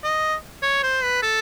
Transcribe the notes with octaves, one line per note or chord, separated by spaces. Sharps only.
D#5
C#5
C5
B4
A4